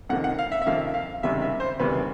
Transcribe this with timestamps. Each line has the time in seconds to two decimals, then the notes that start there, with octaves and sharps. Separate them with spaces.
0.09 F2 C3 D#3 F#5
0.24 F#5
0.39 F5
0.52 E5
0.62 E5
0.66 F2 C3 D#3 F5
0.94 F5
1.23 F#1 E2 C3 D#3 G3 E5
1.42 E5
1.60 C5
1.80 F#1 E2 C3 D#3 G3 B4